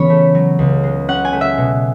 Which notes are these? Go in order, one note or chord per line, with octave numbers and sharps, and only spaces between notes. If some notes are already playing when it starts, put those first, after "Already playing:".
Already playing: C#3 E3 B3 C#4 C#5 B5
A3
F#3
C#2
G#3
C#4 F#5
G#5
A3
E5
B2